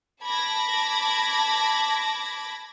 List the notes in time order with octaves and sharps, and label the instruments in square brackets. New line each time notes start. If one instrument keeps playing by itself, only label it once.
[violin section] A5 B5 D6 G#6 A#6